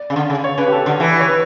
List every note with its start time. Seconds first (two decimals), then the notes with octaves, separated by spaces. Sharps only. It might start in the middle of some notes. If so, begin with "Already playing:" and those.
Already playing: D5
0.10 C#3
0.16 D3
0.30 C#3
0.44 C#5
0.58 C#3 B4
0.67 G4
0.72 A4
0.85 D3 G4
1.00 E3
1.19 C#5
1.28 B4